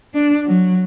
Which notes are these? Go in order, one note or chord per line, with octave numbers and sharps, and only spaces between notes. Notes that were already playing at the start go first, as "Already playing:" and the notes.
D4
F#3